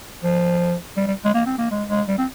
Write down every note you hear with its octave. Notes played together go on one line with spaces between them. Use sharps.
F3
G3
G3
G#3
A#3
C4
A#3
G#3
G#3
G3
C4